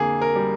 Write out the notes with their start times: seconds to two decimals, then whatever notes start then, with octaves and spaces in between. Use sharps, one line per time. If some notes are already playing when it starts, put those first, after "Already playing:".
Already playing: F2 D3 A#3 G#4
0.22 A#4
0.36 G3